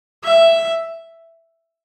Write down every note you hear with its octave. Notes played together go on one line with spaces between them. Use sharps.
E5